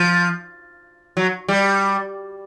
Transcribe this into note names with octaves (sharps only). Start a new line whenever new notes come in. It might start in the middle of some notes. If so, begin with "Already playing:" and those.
Already playing: F3
F#3
G3